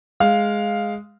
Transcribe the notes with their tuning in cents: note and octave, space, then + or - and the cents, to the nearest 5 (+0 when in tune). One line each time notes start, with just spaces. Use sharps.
G#3 +0 F5 +0